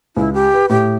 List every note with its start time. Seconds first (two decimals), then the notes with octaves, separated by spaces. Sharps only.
0.17 C#2 E4
0.34 G4
0.54 B4
0.69 A2 G4